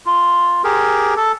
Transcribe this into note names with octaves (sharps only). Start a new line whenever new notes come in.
F4
G4 G#4 A#4
A4